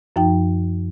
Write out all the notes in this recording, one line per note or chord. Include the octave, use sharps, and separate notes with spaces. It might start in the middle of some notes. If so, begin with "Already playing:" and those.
F#2 F3 D#4 G5